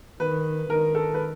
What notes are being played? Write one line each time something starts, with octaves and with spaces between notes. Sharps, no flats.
D#3 B4
D#3 A#4
A4
B4